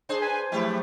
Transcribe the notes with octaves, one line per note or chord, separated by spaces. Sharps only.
D4 G#4 C5
B4 G#5
F3 F#3 A3 E4 G4 B4